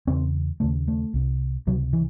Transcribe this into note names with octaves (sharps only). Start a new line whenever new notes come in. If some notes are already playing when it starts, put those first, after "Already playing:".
E2 C#3 C4
D#2 C#3 A3
A3
C2 C3
C#2 C3 F#3
E3